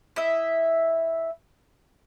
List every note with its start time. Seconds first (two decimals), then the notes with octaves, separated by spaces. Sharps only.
0.16 E4 D#5 E5